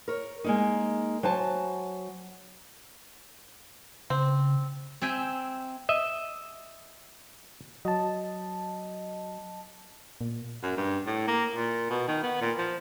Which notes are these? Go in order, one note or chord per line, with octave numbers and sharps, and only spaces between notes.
A#4 C#5
G#3 A#3 D#4
F#3 C5 G#5 A5
C#3 C4
C4 E5 G5 G#5
D#5 E5
F#3 D#5 A5
A#2
F#2
G2
A2
A#3
A#2
B2
D#3
B3
A#2
F3